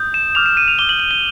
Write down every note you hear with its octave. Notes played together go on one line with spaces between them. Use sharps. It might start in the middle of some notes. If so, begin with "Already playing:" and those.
Already playing: D#6 G6
E7
D6 F6 F7
E7
D#7
F7
D6 F6 G7
F#7
F#7
G7